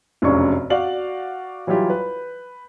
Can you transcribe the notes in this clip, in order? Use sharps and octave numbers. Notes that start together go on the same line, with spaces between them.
F1 F#2 C#3 D4 C#5 C#6
F#4 D5 F5 F#7
E3 F#3 G3 F4 G4
B4